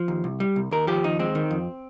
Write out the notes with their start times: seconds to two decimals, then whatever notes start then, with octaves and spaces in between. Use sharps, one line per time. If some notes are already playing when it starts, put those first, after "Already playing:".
Already playing: F3
0.08 D#2
0.24 C2
0.40 G3
0.56 C2
0.71 D#2 A#4
0.87 F3 G4
1.04 D#2 D#4
1.19 G#3 C4
1.35 D#3
1.51 F2